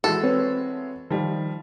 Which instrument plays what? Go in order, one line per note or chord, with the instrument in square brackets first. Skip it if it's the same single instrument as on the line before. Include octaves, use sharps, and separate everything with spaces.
[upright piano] E3 G#3 F#4 [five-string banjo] A4
[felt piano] C4 B4 C#5
[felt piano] D#3 [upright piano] F3 G3